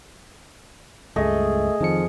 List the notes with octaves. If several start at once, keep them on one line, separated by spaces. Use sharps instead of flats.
C#2 G2 G#3 A3 G#4 D#5
F2 D#3 F3 C#7